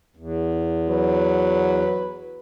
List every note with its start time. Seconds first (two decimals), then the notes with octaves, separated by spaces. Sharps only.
0.17 E2
0.89 F#3 B4